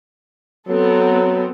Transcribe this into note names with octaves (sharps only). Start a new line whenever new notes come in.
F#3 B3 C4 A4